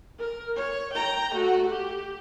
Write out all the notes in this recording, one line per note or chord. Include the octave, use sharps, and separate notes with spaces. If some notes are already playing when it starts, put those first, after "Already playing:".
A#4
C#5
G5 A#5
A3 F#4
G4